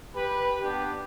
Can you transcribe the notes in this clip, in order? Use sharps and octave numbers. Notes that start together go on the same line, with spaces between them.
G4 B4
B3 D4 G4